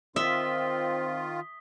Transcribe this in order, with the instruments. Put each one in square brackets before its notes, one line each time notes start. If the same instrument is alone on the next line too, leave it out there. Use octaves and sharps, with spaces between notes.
[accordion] D#3 F4 [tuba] C4 [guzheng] E5 [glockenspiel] D#6 B6 G7